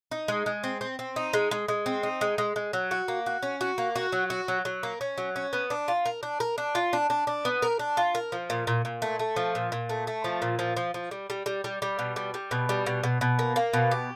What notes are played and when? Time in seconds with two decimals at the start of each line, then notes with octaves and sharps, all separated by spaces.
0.11 D#4
0.28 G#3
0.46 G#3
0.64 C4
0.81 C4
0.99 C4
1.16 D#4
1.33 G#3
1.51 G#3
1.68 G#3
1.86 C4
2.03 D#4
2.21 G#3
2.38 G#3
2.56 G#3
2.73 F#3
2.91 F#4
3.08 A#3
3.26 F#4
3.43 C#4
3.61 F#4
3.78 A#3
3.96 F#4
4.12 F#3
4.30 F#4
4.48 F#3
4.65 F#3
4.83 A#3
5.01 C#4
5.18 F#3
5.36 C#4
5.53 B3
5.70 D4
5.88 F4
6.06 A#4
6.23 D4
6.40 A#4
6.58 D4
6.75 F4
6.93 D4
7.10 D4
7.27 D4
7.45 B3
7.62 A#4
7.79 D4
7.97 F4
8.15 A#4
8.32 F3
8.50 A#2
8.67 A#2
8.85 A#2
9.02 A3
9.19 A3
9.36 F3
9.55 A#2
9.72 A#2
9.89 A3
10.07 A3
10.24 F3
10.42 A#2
10.59 F3
10.77 F3
10.94 F3
11.11 G3
11.30 G3
11.46 G3
11.64 G3
11.82 G3
11.99 B2
12.16 G3
12.34 G3
12.51 B2
12.69 G3
12.86 B2
13.04 B2
13.21 B2
13.39 A#3
13.56 A#3
13.73 B2
13.91 G4